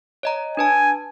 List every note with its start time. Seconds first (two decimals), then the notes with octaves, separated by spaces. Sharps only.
0.23 C#5 D#5 A#5
0.57 D4 B4 G#5 A5